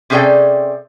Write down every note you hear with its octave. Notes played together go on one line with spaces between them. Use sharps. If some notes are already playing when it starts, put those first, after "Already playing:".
C3 C#4 G#4 A4 D5 G5